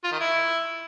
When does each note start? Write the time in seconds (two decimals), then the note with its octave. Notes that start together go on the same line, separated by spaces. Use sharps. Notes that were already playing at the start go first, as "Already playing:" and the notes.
0.04 F4
0.12 D#3
0.20 E4